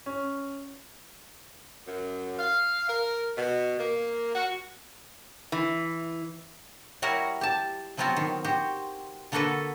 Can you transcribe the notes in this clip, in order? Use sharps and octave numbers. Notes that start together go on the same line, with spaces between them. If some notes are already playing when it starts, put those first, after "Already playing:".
C#4
F#2
F5
A#4
B2
A#3
F#4
E3
G3 E4 F#4 A#4 C#5 F#5
G4 A5
F3 F#3 B3 C4 F4 F#4
D#3
F#4 G4 C5
D3 A#3 D4 F#4 A4 B4